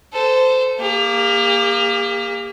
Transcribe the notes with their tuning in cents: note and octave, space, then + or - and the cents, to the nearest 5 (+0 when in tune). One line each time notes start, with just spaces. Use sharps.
A4 +0 C5 -20
A#3 +0 G4 +45